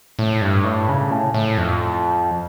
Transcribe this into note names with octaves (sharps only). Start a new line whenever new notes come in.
A2
G2
A2
C#3
A2
A2
F2